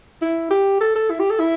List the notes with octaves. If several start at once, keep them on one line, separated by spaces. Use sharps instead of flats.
E4
G4
A4
A4
E4
G4
A4
E4